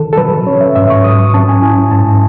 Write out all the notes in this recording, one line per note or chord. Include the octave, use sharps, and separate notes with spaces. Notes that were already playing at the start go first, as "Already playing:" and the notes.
Already playing: D#3 A4
A4
F#3 B4
C#4 C#5
E5
G#2 E5
C#6
F#3 D#6
C#6
C#4 A5
G#5
E4 G#5
G#2 A5